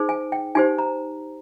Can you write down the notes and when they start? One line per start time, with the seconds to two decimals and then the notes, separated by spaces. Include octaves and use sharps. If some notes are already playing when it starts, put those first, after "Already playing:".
Already playing: D#4 G#4 C5
0.09 G#5
0.32 G5
0.55 D#4 G4 C5 G#5
0.78 A#5